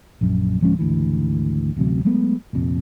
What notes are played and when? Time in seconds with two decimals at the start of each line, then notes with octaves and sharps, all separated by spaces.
0.21 A#1 F#2
0.61 D1 F3 G#3 C#4
0.79 G#1 D2 E3
1.76 D1 A1 C3 F#3
2.05 F#3 G#3 A3 B3
2.53 F1 A#1 F2